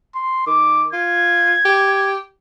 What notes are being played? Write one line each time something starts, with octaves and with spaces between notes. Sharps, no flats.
C6
D#3 D6
F4 G#6
G4